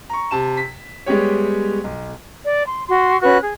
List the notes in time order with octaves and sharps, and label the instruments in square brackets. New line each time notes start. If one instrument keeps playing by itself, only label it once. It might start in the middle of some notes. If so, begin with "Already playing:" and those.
[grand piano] A#5 C#6
C3 A5 E7
B6
G3 G#3 B3 G4 C#5
B1
[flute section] D5
C6
F#4 C6
C#4 F#4 B4 F#6
G#4